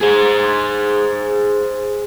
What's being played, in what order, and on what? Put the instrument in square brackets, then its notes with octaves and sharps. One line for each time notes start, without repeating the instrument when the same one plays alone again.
[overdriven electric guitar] G#4 C5